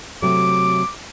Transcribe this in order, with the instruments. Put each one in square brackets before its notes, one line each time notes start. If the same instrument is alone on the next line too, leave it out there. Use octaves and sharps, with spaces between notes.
[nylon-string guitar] C3 F#3 A3 [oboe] D6